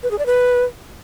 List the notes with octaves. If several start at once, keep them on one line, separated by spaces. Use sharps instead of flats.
B4
G#4
D5
B4